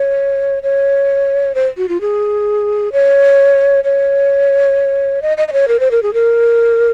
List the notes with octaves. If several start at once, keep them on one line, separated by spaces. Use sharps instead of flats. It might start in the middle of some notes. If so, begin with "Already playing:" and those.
Already playing: C#5
C#5
C5
F#4
F4
G#4
C#5
C#5
D#5
D#5
D#5
C#5
A#4
C5
A#4
G#4
A#4